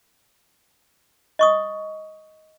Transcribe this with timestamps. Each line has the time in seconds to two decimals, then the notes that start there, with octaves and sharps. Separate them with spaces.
1.39 D#5 C#6 D#6